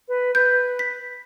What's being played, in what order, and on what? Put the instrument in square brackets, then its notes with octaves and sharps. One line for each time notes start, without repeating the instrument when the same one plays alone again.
[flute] B4
[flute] B4 [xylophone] G6
[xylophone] B6